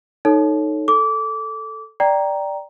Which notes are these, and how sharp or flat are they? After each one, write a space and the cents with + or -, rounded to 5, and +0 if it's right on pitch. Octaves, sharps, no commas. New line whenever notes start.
D#4 -5 A4 +0 C#5 +0
A4 +0 D6 -25
D5 +0 G5 +0 A#5 +5